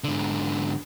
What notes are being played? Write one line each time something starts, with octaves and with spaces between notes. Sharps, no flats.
G#2 D3